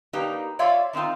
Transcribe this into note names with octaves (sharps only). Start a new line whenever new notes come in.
A#3 D4 D#4 G4 B4
F4 C#5 D5 E5 F5
D#3 C4 D#4 F4